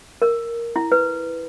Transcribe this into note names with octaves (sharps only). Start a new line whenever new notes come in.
A#4
E4
B4